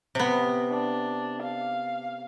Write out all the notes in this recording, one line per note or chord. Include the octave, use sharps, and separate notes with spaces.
C3 B3
D4
F5